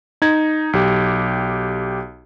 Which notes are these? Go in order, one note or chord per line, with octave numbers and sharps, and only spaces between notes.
D#4 G#6
B1 G4